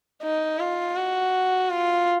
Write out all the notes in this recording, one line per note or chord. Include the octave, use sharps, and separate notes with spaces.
D#4
F4
F#4
F4